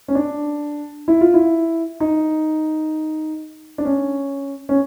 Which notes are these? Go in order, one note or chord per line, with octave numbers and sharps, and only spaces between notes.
C#4
D4
E4
F4
E4
D#4
D4
C#4
C#4